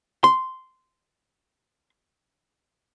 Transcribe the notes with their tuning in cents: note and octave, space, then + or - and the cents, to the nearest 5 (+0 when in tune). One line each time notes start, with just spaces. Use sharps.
C6 -10